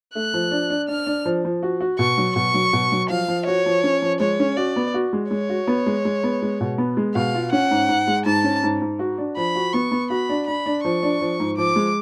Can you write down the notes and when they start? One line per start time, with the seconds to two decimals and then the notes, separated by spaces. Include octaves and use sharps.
0.15 A3 F#6
0.34 F3
0.51 D4
0.70 D4
0.88 D4 F6
1.07 D4
1.26 F3
1.45 F3
1.63 F#4
1.81 F#4
1.99 B2 C#6
2.17 F#3
2.36 B2 C#6
2.54 F#3
2.73 B2
2.92 F#3
3.10 F3 F5
3.28 F3
3.46 F#4 C#5
3.66 F3
3.84 C#4
4.02 F3
4.20 G#3 C#5
4.40 C#4
4.57 F#4 D5
4.76 B3
4.94 F#4
5.13 G#3
5.31 G#3 C#5
5.49 F#4
5.67 B3
5.86 G#3
6.05 G#3
6.24 B3
6.42 G#3
6.61 B2
6.78 B3
6.97 G#3
7.15 B2 F5
7.34 F4
7.52 C#4 F#5
7.71 G#2
7.89 G#2
8.07 G#3
8.26 G#2 A5
8.44 C#4
8.63 G#2
8.81 G#2
8.99 F#4
9.18 D4
9.37 F3 B5
9.55 F#4
9.73 B3 C#6
9.91 B3
10.10 F#4 B5
10.29 D4
10.47 D4 B5
10.66 D4
10.84 F3 C#6
11.03 D4
11.21 F3
11.40 G#2
11.57 F3 D6
11.76 G#3